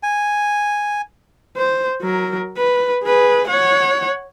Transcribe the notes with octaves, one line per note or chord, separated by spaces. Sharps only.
G#5
C5
F#3 A#4
B4
G#4 B4
C#5 F#5